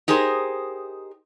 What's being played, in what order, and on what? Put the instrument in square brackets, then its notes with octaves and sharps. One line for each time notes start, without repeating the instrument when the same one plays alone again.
[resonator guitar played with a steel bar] D#4 G4 G#4 A#4 C5